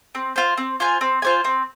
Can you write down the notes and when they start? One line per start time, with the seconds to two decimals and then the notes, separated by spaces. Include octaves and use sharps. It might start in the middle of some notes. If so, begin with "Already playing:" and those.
0.15 C4
0.36 F4 C5
0.58 C4
0.80 F4 C5 G#5
1.01 C4
1.22 F4 C5 G#5
1.44 C4